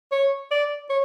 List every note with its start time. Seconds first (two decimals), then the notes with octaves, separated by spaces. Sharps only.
0.12 C#5
0.51 D5
0.90 C#5